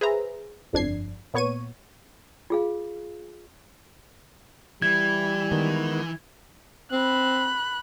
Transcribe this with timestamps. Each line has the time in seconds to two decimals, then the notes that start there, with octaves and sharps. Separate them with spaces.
0.01 G#4 B4 C5 E5 A#5
0.73 G1 F2 D4 G#6 C7
1.34 A#2 B3 C#5 C#6 G#6 D#7
2.50 F4 G#4 F5
4.82 E3 G3 G#6
5.52 D#3 G#3 B3
6.92 C4 B5 F#6